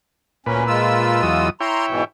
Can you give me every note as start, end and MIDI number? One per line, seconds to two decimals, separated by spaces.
0.46 0.64 38
0.46 1.22 46
0.46 0.64 61
0.46 1.22 71
0.68 1.48 56
0.68 1.48 65
0.68 1.48 88
1.23 1.50 40
1.23 1.50 54
1.23 1.50 87
1.60 2.05 64
1.60 2.05 73
1.60 2.05 79
1.60 1.86 82
1.60 1.86 84
1.88 2.03 44
1.88 2.03 47
1.88 2.03 52